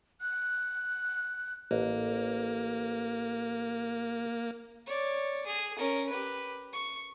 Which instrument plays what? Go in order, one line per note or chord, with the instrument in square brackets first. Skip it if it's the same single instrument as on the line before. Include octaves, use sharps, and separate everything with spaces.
[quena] F#6
[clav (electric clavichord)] A1 [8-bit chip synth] A#3
[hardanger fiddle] C#5 D5
G#4
C#4 A#4
G4 B4
C#6